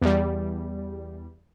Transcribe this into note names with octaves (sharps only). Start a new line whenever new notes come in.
E2 G3